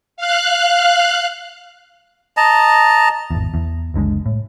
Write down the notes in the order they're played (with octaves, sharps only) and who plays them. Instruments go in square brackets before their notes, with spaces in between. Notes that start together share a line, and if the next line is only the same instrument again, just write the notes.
[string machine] F5 F#6
[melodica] D#5 A5 A#5
[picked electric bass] G#1 E2
E2
F#1 C#2 D3 G#3
A2